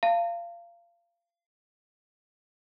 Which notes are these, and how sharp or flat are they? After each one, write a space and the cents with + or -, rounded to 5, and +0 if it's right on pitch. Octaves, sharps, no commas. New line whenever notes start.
F5 -25 A5 +40